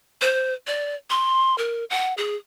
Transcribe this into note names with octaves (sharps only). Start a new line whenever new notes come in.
C5
D5
C6
A#4
F#5
G#4